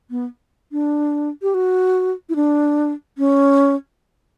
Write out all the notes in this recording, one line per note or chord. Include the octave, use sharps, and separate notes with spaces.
B3
D4
G4
F#4
E4
D4
C#4